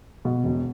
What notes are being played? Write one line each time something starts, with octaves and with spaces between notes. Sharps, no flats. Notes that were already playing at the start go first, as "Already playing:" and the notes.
B2
E1